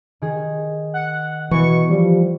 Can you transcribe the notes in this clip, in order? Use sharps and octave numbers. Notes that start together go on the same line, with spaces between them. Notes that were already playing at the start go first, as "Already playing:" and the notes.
D#3 G#4
F#5
B2 E3 C#6
F3 G3